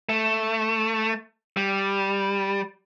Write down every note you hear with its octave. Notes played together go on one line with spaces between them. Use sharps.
A3
G3